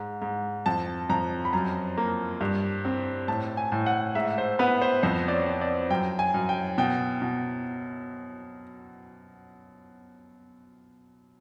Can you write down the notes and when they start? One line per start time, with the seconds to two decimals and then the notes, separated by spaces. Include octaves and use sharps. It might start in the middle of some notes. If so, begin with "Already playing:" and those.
Already playing: G#2
0.22 G#2
0.66 F2 A5
1.09 F2 A#5
1.45 B5
1.53 F#2 A#5
1.97 A#3
2.41 G2
2.85 C4
3.28 A2 A5
3.57 G#5
3.72 A2
3.86 F#5
4.15 G#2 E5
4.38 C5
4.59 B3 B4
4.82 C5
5.03 F2 C5
5.28 D5
5.32 C#5
5.47 C4
5.61 D5
5.90 F#2 G5
6.19 G#5
6.34 F#2
6.49 G5
6.78 B2 G5
7.22 B2